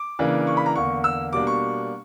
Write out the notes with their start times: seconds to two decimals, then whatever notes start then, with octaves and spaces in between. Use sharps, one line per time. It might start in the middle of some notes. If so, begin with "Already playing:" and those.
Already playing: D6
0.19 C#3 E3 A#3 D4
0.47 C#6
0.57 B5
0.66 A#5
0.76 E2 D3 A#3 C#6
1.04 E6
1.33 B2 G3 A#3 D4 D6
1.47 C#6